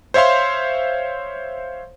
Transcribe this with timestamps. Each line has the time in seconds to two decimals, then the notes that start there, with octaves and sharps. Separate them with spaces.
0.14 C5 C#5 E5 F5 C6